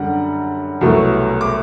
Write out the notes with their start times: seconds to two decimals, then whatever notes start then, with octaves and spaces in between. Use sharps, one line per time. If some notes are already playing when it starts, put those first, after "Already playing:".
Already playing: F#2 D3 G3 F#5
0.81 C2 B2 F#3 A3
1.41 D6